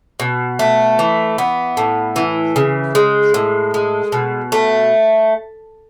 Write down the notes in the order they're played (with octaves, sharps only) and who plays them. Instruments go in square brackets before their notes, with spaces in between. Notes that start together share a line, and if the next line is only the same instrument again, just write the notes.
[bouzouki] B2
A3
E3
B3
A2
E3
C#3
G#3
A2
G#3
B2
A3